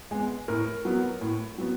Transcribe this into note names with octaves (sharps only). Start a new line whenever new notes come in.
G#3 B3
A2 A#4
F#3 B3
A2
F#3 B3